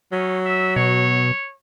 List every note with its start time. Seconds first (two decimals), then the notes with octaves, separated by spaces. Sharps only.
0.12 F#3 C#4
0.45 E5
0.76 B2 C#5